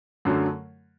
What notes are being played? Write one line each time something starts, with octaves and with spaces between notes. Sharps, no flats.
F#2 D3 F#3 A3